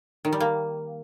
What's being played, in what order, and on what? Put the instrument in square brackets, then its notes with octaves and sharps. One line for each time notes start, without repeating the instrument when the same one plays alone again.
[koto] D#3
G3
A#3